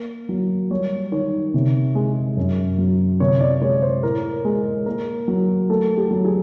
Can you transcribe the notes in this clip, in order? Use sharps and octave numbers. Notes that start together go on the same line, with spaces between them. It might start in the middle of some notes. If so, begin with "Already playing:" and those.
Already playing: A#3
F#3
G3 C#5
D#3 C#5
C3
G#3
F#2
F#3
C3 C#5
D5
G#3 C#5
C5
A2 A#4
G#3
A#3 A#4
F#3
A3 A4
G4
F#3
G#4